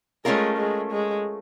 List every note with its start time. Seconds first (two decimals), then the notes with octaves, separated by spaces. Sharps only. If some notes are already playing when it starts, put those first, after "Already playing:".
0.25 G#3 A3 C#4 F4 A#4
0.57 G#3
0.92 G#3